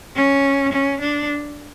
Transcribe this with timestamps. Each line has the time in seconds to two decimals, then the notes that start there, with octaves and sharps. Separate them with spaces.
0.16 C#4
0.73 C#4
1.01 D4